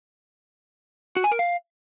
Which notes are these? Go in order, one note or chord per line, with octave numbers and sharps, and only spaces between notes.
F#4
G#5
A#4
F5